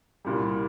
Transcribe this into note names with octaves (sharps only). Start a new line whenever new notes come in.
C2 A#2 G3